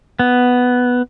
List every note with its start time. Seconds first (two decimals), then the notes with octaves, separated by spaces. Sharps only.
0.19 B3